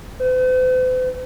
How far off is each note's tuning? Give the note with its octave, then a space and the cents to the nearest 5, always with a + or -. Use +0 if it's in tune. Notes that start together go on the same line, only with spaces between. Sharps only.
C5 -45